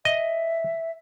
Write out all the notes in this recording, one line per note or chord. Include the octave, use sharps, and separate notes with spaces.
D#5 E5